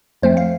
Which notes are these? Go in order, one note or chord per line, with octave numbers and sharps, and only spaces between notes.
F2 F3 A3 C4 C5
F5